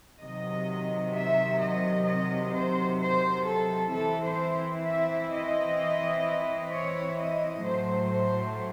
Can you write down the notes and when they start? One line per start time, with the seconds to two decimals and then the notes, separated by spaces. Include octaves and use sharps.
0.22 C3 D#3 F#3 D#5
1.14 E5
1.60 D#5
2.07 D#5
2.53 C5
3.00 C5
3.46 A4
3.93 E3 C4 E4 A4
4.24 C5
4.85 E5
5.32 D#5
6.71 C#5
7.17 D#5
7.63 A2 F#3 A3 C5
8.10 C5